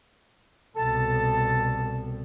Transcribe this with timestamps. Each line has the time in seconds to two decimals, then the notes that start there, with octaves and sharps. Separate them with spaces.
0.76 C2 B2 A4 A5